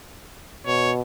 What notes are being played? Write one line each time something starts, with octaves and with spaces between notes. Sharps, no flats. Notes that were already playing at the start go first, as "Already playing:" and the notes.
B2 C#5